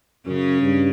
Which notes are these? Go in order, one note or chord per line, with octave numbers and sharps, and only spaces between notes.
F#2 C#3 C#4
G2